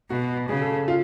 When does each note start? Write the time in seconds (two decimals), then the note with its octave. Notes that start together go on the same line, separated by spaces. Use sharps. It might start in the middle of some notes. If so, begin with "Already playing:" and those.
0.10 B2 F#4
0.49 C#3 G#4
0.62 A4
0.88 F4